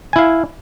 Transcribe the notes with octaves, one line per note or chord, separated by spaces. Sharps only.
E4 F5 G#5